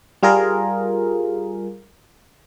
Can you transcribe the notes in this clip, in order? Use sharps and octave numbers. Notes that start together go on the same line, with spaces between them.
G3 F4 G#4 A#4